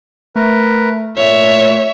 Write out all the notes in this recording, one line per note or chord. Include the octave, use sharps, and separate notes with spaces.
A3 A#4 B4
A#2 C#5 E5